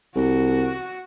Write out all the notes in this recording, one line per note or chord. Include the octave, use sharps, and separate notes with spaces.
C2 F#4